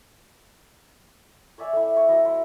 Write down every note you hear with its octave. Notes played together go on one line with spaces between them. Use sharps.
C#5 D5 E5 G#5
A3 E4
C#5
F#3 E4 D#5
E4 C6